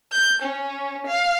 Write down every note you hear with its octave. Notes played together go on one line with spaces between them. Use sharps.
G6
C#4
F5